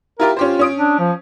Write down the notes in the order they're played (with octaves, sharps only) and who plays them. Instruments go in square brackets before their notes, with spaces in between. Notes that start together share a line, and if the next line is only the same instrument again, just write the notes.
[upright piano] E4 F4 G4 [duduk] A#4
[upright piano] C#4 G4 C5 [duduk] F4
[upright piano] C#4 D#6 D7
[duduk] D4
F3